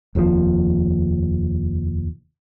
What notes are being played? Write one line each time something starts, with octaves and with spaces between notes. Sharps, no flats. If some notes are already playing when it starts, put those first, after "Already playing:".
F1 D#2 A#2 F3